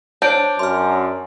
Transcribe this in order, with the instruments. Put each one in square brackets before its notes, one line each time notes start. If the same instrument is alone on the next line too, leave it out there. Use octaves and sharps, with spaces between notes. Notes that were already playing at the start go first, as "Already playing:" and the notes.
[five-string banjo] D4 [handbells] C5 C#5 [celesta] G6 D7
[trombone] F#2 [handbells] C6 F6